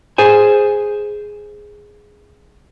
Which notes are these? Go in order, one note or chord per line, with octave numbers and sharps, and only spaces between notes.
G#4 C5 G#5